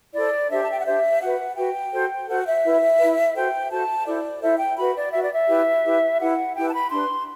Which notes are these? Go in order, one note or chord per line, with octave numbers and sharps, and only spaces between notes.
E4 A4 C5 D5
D4 G4 C5 E5
A5
G5
F#5
D4 G4 C5 E5
F#4 B4 F#5
F#4 B4 G5
F#4 A4 C5
F#4 A4 C5 F#5
E5
E4 B4
E4 B4
F#4 A4 C5 G5
F#4 A4 C5 A5
E4 A4 C5 D5
E4 A4 C5 E5
G5
F#4 B4 B5
D5
F#4 B4 E5
D5
E5
E4 G4 B4
E4 G4 B4
E4 G4 B4 F#5
E4 G4 B4 G5
A5
B5
D4 G4 B4 C6